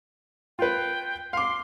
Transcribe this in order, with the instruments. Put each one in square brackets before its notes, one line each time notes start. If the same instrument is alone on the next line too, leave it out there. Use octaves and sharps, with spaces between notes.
[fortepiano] F4 B4 [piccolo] G5
[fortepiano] F5 D6 [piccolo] C6